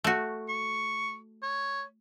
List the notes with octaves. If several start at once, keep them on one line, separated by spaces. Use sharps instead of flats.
A3 F#4
C#6
C#5